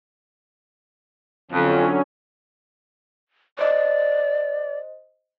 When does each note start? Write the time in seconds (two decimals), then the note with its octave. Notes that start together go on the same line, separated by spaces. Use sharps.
1.51 F2 D3 F#3 C#4
3.59 C5 D5 D#5